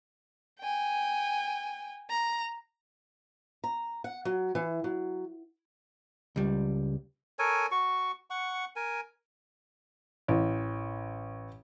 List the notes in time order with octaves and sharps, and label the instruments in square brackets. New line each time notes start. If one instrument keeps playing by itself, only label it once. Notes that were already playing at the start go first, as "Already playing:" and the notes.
[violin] G5 G#5
A#5
[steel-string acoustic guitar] A#5
F#5
F#3
E3
F#3
[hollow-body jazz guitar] C#2 G3
[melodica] A4 A#4 C#5 G#5
F#4 C#6
F#5 C#6
A#4 G#5
[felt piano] A1